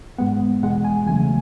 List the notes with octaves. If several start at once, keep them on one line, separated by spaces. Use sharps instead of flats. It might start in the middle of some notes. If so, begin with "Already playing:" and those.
G#2 G#3 B3 F#5
E2 B2 G#3 F#5
G#5
E2 C#3 F#3 A3 G#5